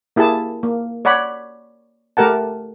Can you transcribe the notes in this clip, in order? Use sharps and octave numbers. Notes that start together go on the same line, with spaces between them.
A#3 E4 G4 G#4 A5
A#3
C#5 D5 F#5 B5
A3 G4 A#4 F#5 A5